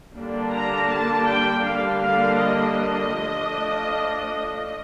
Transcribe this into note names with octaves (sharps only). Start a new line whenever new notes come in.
D3 G3 A#3 D4
A#5
A5
G5
D3 G3 A#3 D4 F5
F5
D#5
F3 A3 D4